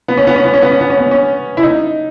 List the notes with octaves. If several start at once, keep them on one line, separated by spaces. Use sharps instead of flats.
B3
C#4
B3
C#4
B3
C#4
B3
C#4
B3
C#4
B3
C#4
E4
D#4